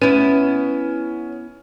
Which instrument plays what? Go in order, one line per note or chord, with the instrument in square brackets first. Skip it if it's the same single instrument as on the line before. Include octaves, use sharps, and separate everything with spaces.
[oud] B3 E4 [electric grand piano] C#4 D#7